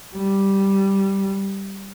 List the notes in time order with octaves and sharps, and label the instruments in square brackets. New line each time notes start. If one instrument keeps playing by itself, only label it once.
[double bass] G3